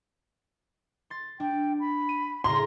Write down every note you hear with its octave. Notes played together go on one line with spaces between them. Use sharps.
C6 A6
D4 G5
B5
D#7
A2 C#3 A#5 C6